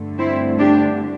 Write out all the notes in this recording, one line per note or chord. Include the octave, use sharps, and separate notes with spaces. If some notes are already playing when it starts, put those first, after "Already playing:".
Already playing: G2 D3 A3
C4 E4
D4 G4